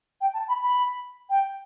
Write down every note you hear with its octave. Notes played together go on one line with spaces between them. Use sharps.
G5
A5
B5
B5
G5